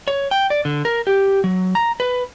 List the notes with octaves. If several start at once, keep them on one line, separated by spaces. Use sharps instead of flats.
C#5
G5
D5
D3
A#4
G4
F#3
A#5
B4